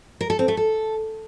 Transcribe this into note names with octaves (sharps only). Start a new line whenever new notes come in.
A#4
A4
C4
A3
A4